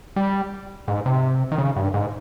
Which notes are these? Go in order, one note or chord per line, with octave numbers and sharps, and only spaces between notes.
G3
G#2
C3
D#3
C#3
G2
G#2